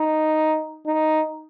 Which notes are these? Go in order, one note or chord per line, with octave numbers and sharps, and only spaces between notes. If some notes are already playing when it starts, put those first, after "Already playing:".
Already playing: D#4
D#4